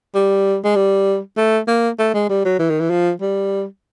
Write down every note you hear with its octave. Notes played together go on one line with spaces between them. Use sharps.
G3
G#3
G3
A3
A#3
A3
G#3
G3
F#3
E3
D#3
E3
F3
G3